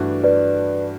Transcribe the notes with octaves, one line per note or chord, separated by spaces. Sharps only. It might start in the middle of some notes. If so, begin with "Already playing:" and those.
Already playing: G2 E3 A3 D4 F#4
B4 D5